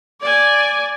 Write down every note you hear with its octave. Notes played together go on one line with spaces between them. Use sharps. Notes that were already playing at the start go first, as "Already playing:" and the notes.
D5 G#5